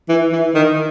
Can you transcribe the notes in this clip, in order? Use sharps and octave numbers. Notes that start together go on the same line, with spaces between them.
E3
E3
D#3